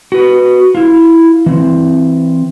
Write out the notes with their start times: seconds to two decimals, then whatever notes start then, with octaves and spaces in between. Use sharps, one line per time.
0.12 F#4 B4
0.75 E4 F4
1.46 E3 C4